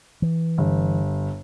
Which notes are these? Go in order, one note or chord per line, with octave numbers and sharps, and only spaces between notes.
E3
G1